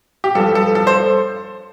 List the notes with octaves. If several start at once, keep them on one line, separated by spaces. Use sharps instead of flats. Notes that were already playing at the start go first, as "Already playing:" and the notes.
G4
G2 F3 A4
A4
A4
C5